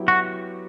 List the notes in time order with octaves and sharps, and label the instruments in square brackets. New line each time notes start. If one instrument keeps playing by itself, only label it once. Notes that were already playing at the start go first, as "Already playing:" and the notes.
Already playing: [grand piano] F#3 B3 E4 G4
[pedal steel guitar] F#4